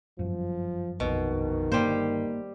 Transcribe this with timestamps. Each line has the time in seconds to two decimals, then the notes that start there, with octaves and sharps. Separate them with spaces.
0.19 G1 F#2 F3
1.00 A#1 F2 B2 D#3
1.72 G1 G3 A#3 C5